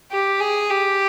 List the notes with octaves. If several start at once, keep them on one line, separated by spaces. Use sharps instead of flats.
G4
G#4
G4